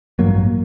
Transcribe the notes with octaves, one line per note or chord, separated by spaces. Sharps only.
A1 G2 F#3 A#3